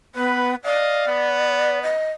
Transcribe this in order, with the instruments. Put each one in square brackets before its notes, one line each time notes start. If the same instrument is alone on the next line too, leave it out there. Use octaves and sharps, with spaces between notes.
[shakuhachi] B3 [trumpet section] B4
[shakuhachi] D5 [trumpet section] D#5 F5
[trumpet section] B3
[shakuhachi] D#5